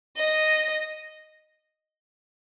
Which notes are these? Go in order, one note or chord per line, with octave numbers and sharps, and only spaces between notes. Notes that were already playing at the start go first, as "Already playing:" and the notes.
D#5